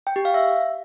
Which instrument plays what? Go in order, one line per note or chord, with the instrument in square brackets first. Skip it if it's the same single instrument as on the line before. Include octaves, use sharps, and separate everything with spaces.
[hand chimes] G5
G4
F5
E5